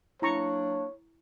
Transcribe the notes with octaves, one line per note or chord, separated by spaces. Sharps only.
F#3 A#3 D4 E4 C#5 A#5 C#6